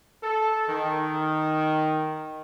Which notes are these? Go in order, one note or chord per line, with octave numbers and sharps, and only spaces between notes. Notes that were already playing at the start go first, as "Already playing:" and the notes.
A4
D#3